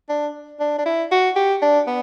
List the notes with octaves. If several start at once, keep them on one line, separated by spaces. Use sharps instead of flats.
D4
D4
D4
E4
F#4
G4
D4
B3